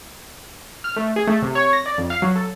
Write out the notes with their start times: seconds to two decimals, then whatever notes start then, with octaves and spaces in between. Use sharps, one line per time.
0.84 F6
0.96 A3
1.16 G#4
1.27 A3
1.42 C3
1.55 C#5
1.73 A#6
1.86 D5
1.98 F2
2.10 F5
2.22 F#3
2.36 A4